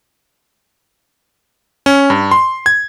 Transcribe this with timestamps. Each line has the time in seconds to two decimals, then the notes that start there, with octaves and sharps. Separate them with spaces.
1.86 C#4
2.10 G2
2.31 C6
2.66 G#6